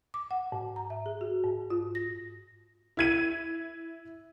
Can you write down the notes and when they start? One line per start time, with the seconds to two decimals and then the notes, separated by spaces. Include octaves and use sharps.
0.14 D6
0.31 F#5
0.52 G#2
0.76 A#5
0.90 E5
1.06 G#4
1.21 F#4
1.44 G#2
1.70 F4
1.95 A#6
2.97 E4 G#6 D#7